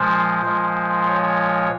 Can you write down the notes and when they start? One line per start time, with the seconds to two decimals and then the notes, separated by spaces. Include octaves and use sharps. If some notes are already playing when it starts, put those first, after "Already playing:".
Already playing: A#2 F3 G#3 C5
0.45 A#2 F3 G#3
1.06 C#5